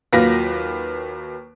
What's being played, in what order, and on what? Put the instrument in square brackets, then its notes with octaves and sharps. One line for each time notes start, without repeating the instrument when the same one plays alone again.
[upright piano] D#2 F#3 A#3 F4 B4 A#6